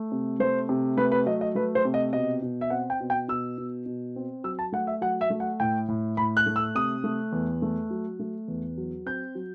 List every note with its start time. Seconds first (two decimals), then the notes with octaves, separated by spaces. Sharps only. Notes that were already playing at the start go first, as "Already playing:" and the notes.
Already playing: A3
0.12 C3
0.40 A3 C5
0.69 C3
0.97 A3 B4
1.12 B4
1.26 F#3 D#5
1.41 D#5
1.55 A3 B4
1.75 C5
1.85 C3
1.94 D#5
2.13 B2 D#5
2.42 B2
2.61 E5
2.70 C4 F#5
2.90 G5
3.00 B2
3.10 G5
3.28 B2 E6
3.58 B2
3.86 B2
4.16 C4
4.44 F#3 E6
4.59 A5
4.72 A3 F#5
4.87 E5
5.01 F#3 F#5
5.21 E5
5.30 A3
5.40 F#5
5.60 A2 G5
5.88 A2
6.17 A2 B5
6.37 F#6
6.46 A3
6.56 E6
6.75 C3 D#6
7.04 A3
7.32 E2
7.62 A3
7.90 F#3
8.19 A3
8.48 E2
8.78 F#3
9.06 C4 G6
9.35 F#3